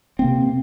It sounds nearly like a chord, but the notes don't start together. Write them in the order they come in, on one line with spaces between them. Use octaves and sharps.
C4 A#3 C3